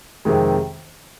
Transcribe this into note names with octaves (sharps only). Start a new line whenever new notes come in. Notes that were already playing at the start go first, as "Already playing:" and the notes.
F2 C3 D#3 G#3